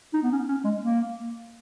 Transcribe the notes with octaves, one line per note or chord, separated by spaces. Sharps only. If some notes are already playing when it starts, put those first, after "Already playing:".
D#4
B3
C#4
C#4
G#3
A#3